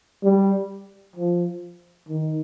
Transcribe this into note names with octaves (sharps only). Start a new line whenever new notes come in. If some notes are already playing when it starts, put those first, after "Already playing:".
G3
F3
D#3